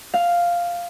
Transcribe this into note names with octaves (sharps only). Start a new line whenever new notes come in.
F5